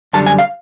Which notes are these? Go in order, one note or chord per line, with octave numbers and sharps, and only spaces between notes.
F#2 D3 G3 A5
G#5
F5